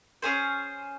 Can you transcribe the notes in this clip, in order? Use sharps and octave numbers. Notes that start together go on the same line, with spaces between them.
C#4 G#4 C5